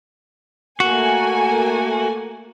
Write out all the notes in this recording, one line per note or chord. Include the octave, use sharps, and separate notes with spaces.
A3 A#3 F#4 G#5